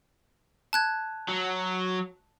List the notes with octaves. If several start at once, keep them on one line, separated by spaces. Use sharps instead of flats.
A5 F#6 G#6
F#3